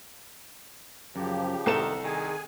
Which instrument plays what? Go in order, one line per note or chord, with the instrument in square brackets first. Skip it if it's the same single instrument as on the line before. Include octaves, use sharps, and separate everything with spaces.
[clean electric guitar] F#2 [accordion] C#3 F3 G4
[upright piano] C2 A4 E7 [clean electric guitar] D#3
[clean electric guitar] D#3 [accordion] G#4 G#5